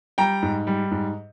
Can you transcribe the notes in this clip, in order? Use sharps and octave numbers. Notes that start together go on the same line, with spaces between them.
G3 G5 A#5
G#2
G3
G#2